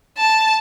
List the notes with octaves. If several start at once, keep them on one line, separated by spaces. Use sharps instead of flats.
A5